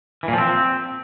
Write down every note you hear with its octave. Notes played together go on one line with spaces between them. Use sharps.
E3
A#2
F3
C4